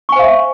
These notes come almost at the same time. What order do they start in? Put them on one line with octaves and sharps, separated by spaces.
C#6 G#5 C5 F5 E5